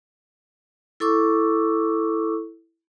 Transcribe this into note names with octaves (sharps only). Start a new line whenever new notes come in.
E4 A4 C#6 D6 E6